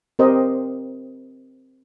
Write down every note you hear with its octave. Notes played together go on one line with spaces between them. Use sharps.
C4 G4 A#4 C5 D#5